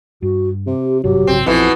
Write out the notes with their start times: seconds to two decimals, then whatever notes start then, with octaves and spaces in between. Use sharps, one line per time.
0.22 G2 F#4
0.67 C3 G4
1.04 G#1 G2 C3 F#3 G4
1.27 A#1 G#2 C#3 C4
1.46 A#1 F2 B2 E3 E4